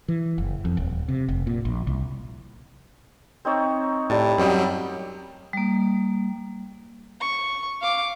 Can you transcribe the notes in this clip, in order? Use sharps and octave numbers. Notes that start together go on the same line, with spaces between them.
E3
F#1
F2
D#1
C3
F1
A#2
A#1
C2
C4 D#4 C#5
A2 G3 A5
F#2 F#3 G3 C4 D#5 G5
G3 A#3
C#6
F5 D6